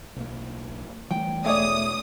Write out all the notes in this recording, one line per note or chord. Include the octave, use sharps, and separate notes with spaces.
B1 A#3
E3 G3 A3 G5
E1 A3 G#4 C#5 D5 E5 D#6